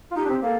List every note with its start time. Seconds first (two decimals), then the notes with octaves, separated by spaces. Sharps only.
0.11 F4
0.16 D#4 G4
0.25 D4
0.29 C4
0.42 A#3 A4